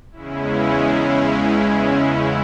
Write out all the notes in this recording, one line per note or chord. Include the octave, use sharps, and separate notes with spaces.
E2 C#3 G#3 C#4 E4